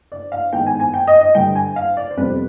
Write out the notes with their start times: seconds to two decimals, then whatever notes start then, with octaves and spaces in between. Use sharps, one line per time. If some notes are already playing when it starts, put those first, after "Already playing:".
0.12 D5
0.32 F5
0.53 G#2 D#3 G#3 B3 G5
0.66 G#5
0.80 G#5
0.94 G5
1.07 D#5
1.21 D#5
1.35 G2 D3 G3 G5
1.55 G#5
1.76 F5
1.97 D5
2.11 C5
2.17 F2 C3 G3 B3 B4